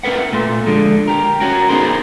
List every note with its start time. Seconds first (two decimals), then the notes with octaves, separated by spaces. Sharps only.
0.03 C4 E4 A#4 B4 F#5
0.33 A#2 A3 C6
0.66 D3 F3 G#3
1.07 G4 A#4
1.40 C#4 F#4 A#4
1.69 B3 D#4 G#4 A#4 C5